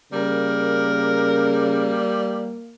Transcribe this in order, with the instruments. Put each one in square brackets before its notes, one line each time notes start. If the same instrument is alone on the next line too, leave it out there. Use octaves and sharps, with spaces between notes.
[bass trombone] C#3 [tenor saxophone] G3 [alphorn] A#3 [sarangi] A#4